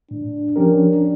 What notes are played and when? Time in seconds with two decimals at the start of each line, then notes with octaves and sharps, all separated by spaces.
0.11 A2 D4
0.56 F3 C#4 G4 A#4